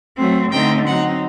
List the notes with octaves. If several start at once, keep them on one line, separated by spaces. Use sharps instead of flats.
F#3 A3 C4
D3 A3 C4 D#4 G5
F#3 C4 D#4 F#5